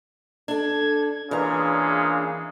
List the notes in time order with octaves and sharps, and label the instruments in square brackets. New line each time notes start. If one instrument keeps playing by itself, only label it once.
[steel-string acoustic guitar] D4 A4 [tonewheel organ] G#6
[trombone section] A#2 C#3 G#3 [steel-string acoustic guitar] E3 A#5 [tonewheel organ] D4